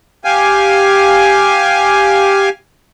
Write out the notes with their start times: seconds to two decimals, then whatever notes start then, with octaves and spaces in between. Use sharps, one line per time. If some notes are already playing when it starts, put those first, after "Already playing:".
0.25 G4 F5 G#5